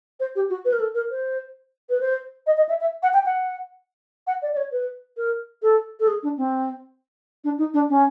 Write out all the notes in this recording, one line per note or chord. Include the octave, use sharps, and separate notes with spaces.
C5
G4
F#4
B4
A#4
A4
A#4
C5
B4
C5
D#5
D#5
E5
E5
F#5
G5
F#5
F#5
D5
D5
C#5
B4
A#4
A4
A4
G#4
D4
C4
D4
D#4
D4
C#4